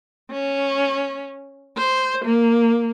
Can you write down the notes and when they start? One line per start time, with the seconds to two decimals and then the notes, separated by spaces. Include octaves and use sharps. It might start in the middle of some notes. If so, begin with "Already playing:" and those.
0.31 C#4
1.78 C5
2.25 A#3